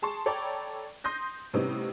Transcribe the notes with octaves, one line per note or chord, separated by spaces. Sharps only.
G#4 A5 C6 C#6
A4 C#5 D5 G5 A#5 B5
C6 D#6 G6 A#6
A2 C3 G3 B3 C#4 D#4